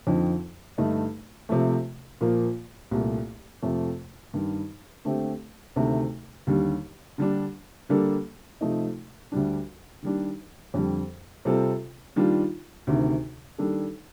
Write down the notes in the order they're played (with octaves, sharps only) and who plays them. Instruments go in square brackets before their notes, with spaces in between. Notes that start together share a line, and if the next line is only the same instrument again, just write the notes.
[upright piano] F2 D3 F3 C4 D#4
G2 D3 A3 D#4
C3 F3 A3
A#2 F3 A#3
C2 A#2 A3
F2 C3 F3 A3
G2 D#3 G3
D3 A3 C4 G4
D2 C3 D#3 A3
D#2 D3 G3
D3 G3 D4
D3 G3 A#3 D4 A4
C3 F3 A3 D#4
D2 D3 G3 D4
D#3 G3 D4
F2 D3 G3
C3 G3 C4 F4 A4
D#3 G3 D4 F4
D2 C3 D#3
D#3 G3 D4 A4